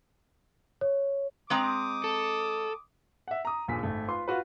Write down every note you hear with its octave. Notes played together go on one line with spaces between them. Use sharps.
C#5
G#3 C4 A#5 D6 D#6
A4
E5 F#5
A#5 D#6
A#1 D#2 A#2 G#4 B6
G#1 A3
F4 B4 C6
F4 F#4 B4